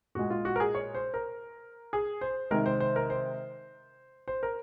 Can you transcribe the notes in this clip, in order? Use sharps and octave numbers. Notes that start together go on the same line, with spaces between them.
A#2 G#3 F#4
F4
F#4
A#4
G#4
C#5
C5
A#4
G#4
C5
C3 D#3 G#3 A#4
C5
C5
A#4
C5
C5
A#4